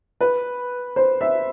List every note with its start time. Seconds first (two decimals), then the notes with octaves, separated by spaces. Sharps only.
0.21 B4
0.96 C5
1.21 E5